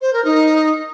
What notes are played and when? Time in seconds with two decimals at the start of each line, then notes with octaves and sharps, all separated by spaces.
0.01 C5
0.13 A#4
0.24 D#4